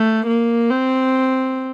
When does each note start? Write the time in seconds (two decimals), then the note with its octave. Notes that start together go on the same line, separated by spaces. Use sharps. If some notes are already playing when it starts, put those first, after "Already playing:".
Already playing: A3
0.26 A#3
0.70 C4